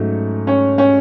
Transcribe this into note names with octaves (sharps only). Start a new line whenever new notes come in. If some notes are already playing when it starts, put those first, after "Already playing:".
Already playing: G#2 F#3 A3 C#4
C#4 C#5
C#4 C#5